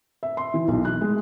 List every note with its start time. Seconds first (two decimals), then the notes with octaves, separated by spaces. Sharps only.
0.23 E5
0.37 C6
0.54 E3
0.68 B1
0.85 F#6
1.01 G#3